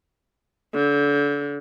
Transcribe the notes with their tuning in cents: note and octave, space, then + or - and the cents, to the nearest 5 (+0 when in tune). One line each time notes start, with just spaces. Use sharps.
D3 -30